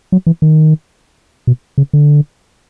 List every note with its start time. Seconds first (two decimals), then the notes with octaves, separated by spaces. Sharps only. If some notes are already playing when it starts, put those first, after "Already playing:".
0.12 F#3
0.27 E3
0.42 D#3
1.47 B2
1.78 C#3
1.93 D3